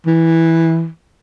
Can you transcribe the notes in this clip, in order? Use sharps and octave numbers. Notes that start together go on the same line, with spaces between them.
E3